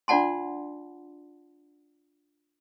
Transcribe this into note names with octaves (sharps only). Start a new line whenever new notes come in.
D4 F4 D5 F#5 A5 C6